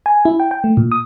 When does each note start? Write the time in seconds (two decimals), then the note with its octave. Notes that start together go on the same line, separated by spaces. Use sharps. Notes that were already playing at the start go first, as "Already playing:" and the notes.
0.06 G#5
0.25 E4
0.40 G5
0.51 G5
0.64 A3
0.77 A#2
0.92 D#6